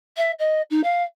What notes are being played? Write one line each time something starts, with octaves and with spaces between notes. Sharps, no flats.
E5
D#5
D#4
F5